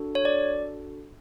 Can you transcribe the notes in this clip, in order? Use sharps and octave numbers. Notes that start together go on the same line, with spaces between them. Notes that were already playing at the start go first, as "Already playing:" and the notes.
Already playing: D4 F#4 A4
C#5
D5